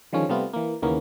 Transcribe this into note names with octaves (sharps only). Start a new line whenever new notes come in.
D3 D#3 F3 G#3 C#4
C3 G3 A3 B3 F4
E3 A#3
D#2 C#3 E3 A#3 B3 C#4